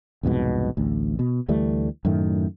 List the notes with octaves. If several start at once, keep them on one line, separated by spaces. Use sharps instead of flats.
C2 F2 G#2 B2
A1 D2
B2
D2 E3 G3 A3
F#2 A2 D#3 A3